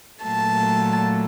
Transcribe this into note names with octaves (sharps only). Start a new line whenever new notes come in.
A#2 F#3 A3 A5